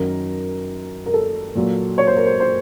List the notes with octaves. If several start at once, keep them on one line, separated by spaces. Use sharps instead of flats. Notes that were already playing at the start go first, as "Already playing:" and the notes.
Already playing: F#2 D#3 F#3 A#4
A#4
A4
A#2 F#3
C#5
C5
A#4
C5
C5